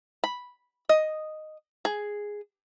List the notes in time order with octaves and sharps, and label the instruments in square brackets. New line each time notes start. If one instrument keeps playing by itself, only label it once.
[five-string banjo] B5
D#5
G#4